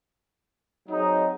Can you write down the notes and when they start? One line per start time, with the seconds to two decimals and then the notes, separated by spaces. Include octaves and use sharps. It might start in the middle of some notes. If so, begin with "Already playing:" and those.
0.87 F#3 C4 D#4 G#4